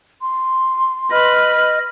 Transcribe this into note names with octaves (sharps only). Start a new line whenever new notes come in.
C6
B4 D#5 B5 F6